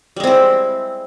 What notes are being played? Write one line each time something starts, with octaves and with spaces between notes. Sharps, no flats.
G3 G#3 C4 E4